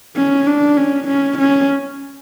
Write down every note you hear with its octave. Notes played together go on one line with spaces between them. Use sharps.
C#4
D4
C#4
C#4
C#4